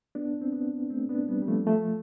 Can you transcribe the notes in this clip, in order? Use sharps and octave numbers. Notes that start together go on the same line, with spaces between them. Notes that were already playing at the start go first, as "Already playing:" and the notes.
B3 D4
C4
B3 D4
A3 C4
B3 D4
G3 B3
G3
F3 A3
F3 A3